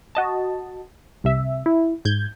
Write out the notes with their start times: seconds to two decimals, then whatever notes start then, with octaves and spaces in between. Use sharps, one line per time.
0.15 F#4 D#5 A5
1.24 C2 C3 E5
1.66 E4
2.05 G#2 G6 G#6